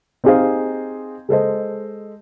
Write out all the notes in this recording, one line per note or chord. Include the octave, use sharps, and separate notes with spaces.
C4 D#4 G4 G#4 C5 F5
G#3 A4 C5 D#5